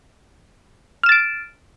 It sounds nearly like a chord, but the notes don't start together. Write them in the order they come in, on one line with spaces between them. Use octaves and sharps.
F6 E7 A6 D7